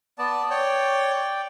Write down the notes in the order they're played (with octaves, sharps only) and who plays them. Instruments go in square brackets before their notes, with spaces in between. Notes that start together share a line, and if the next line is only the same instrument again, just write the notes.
[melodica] B3 [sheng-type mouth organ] D5 A5
[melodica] C#5 [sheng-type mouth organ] D5 G5